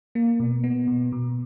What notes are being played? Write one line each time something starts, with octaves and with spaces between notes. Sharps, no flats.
A#3
B2
B3
B2
B2